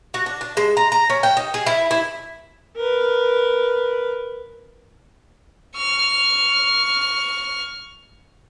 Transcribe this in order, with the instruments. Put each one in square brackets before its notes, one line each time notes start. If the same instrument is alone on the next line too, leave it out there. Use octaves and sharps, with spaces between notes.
[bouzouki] F#4
D4
D4
G#3
A#5
A#5
C#4
G5
D#4
G#4
E4
E4
[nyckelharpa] A#4 B4
[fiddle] C#6 F6